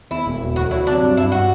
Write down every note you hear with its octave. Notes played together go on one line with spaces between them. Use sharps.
E2 E4
E1
F#3
D2 F#4
F#3 E4
C3 D4
G2
G2 E4
F#4